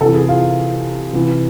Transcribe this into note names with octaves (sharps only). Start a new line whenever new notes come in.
C3 E3 A4
G#4
F4
C3 E3